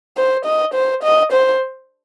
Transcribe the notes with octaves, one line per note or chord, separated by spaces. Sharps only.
C5
D#5
C5
D#5
C5